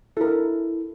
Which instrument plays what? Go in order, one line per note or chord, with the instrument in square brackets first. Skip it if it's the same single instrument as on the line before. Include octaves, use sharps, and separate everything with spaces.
[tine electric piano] E4 [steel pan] A4 A#4